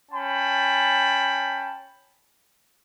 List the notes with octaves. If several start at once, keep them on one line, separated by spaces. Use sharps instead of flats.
C#4 G5 A5 B5